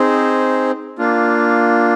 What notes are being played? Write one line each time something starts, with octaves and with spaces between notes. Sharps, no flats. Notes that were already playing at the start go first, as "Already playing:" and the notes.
Already playing: C4 D#4 G#4 C5
A#3 D4 F4